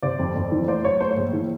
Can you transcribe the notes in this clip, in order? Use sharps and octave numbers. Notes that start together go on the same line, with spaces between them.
C3 C5 D5
F2
F2
E3
A3 C5 D5
F#3 C#5
A3 C5
C#5
A#1
E3